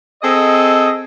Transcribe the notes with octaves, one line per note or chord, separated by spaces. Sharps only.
C4 G#4 A4 D#5